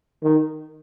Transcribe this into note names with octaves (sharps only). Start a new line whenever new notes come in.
D#3